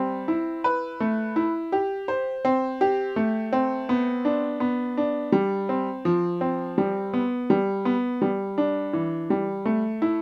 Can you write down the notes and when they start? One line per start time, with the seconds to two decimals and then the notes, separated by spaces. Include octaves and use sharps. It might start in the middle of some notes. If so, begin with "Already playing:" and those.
Already playing: G3 C4
0.28 E4
0.64 B4
1.00 A3
1.36 E4
1.72 G4
2.08 C5
2.45 C4
2.81 G4
3.16 A3
3.53 C4
3.89 B3
4.25 D4
4.60 B3
4.97 D4
5.32 G3
5.69 C4
6.05 F3
6.41 C4
6.78 G3
7.14 B3
7.50 G3
7.85 B3
8.22 G3
8.58 D4
8.93 E3
9.30 G3
9.65 A3
10.02 E4